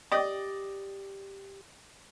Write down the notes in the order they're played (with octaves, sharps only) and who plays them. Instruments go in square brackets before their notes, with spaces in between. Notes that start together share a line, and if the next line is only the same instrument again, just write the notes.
[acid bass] G4 [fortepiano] D5 D#5